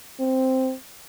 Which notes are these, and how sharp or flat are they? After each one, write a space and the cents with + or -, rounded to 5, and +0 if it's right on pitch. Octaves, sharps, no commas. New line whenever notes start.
C4 +0